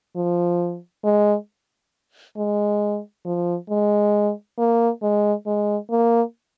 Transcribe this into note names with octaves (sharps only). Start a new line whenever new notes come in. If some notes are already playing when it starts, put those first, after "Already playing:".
F3
G#3
G#3
F3
G#3
A#3
G#3
G#3
A#3